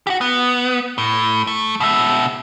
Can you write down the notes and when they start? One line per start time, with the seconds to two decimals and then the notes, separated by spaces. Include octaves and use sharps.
0.07 F#4 G4
0.21 B3
0.98 A2
1.47 A3
1.80 B2 E5